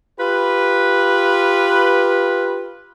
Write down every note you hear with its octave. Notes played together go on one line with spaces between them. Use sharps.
F4 G4 B4